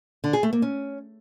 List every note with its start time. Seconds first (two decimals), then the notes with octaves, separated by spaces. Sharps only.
0.24 D3
0.33 G#4
0.43 A3
0.53 A#3
0.62 C#4